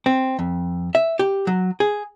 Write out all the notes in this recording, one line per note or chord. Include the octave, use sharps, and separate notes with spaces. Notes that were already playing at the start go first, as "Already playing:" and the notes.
C4
F2
E5
G4
F#3
G#4